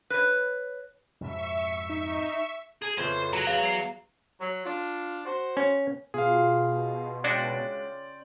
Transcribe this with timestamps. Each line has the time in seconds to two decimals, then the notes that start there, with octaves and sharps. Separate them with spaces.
0.10 B4 C#5
1.21 F2 G#2 B2 E5 C#6
1.89 D#4
2.82 G#4
2.98 F2 C#3 E3 C5
3.33 F#3 A#5
3.47 E2 F5
3.65 C7
4.40 F#3
4.65 D4 F4
5.25 F#4 C5
5.57 C#4
6.14 B2 F4 G#4 F5
7.24 C#3 G#3 D4 F#4 D5 G5